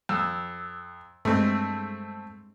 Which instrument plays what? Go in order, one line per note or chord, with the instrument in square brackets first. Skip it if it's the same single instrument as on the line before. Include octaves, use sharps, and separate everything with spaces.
[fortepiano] F2 [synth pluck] E6
[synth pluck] G2 G#3 [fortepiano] A3 C4